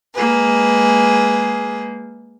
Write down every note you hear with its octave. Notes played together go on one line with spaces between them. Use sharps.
G#3 A#3 G#4 B4